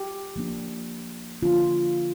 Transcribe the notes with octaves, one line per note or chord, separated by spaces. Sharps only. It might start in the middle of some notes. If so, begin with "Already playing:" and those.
Already playing: G4
F3 A#3 D4
D3 F3 A#3 D4 F4